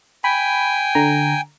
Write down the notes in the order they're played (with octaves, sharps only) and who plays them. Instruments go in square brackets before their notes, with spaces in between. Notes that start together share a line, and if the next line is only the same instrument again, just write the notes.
[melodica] G5 G#5 [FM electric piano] B5
[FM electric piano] D3 A#5